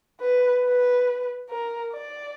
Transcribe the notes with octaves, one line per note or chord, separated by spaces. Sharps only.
B4
B4
A#4
D5